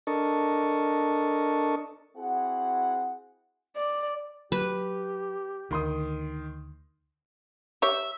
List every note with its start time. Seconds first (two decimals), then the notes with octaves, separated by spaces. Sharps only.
0.07 D4 A4 A#4 D#5 A5 C#6
2.18 C4 E4 F#4 G#4 F#5
3.76 D5
4.52 F#3 G4 B4
5.71 D2 D#3 C6 D#6
7.82 G4 C#5 E5